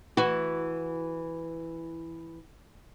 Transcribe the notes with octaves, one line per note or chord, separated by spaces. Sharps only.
E3 F#4